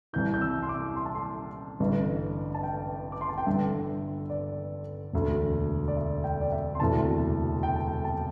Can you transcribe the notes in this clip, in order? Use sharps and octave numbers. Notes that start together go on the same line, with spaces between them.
C2 C3 E3 G6
G6
E6
C6
D6
C6
A5
C6
A1 G2 D3
A5
G5
D6
C6
A5
G5
G1 G2 D3 E5
D5
E1 D2 D3
D5
E5
G5
D5
E5
C6
E1 D2 C3 E3 A5
G5
A5
G5
A5